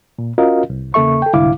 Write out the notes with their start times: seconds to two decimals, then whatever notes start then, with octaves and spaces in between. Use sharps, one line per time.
0.19 A#2
0.38 C#4 F4 F#4 A#4 D#5 F5
0.70 C2
0.94 E2 C#3 A#3 A4 E5 C#6
1.22 A4 G5
1.33 C2 G#2 D3 E4 F5 D6